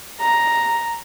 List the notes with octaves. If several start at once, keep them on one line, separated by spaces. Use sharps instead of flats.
A#5